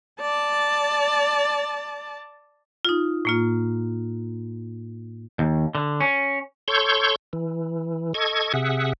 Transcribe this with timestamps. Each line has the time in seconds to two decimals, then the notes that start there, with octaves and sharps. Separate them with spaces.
0.21 D5 A5
2.85 D#4 F4
3.25 A2 A#3 F4
5.39 D#2
5.75 D3
6.00 C#4
6.68 A4 C#5 C6 C#6 G6
7.33 E3
8.14 A4 D#5 C#6 G#6
8.54 C3 G#4 E5 F#5